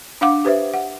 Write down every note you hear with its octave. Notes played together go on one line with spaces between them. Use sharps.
D4 F5 F#5 D6
G4 B4 C5 E5
F#5